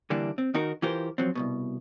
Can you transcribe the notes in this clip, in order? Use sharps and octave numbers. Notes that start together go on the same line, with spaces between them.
D3 E3 G3 A#3 D4
C4
D#3 D#4 F#4 A#4
E3 F4 G4 A#4 C5
F3 F#3 C4
C2 F2 B2